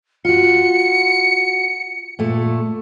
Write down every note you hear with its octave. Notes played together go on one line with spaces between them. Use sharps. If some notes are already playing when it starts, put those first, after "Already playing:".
F4 F#4 C#7
A#2 A3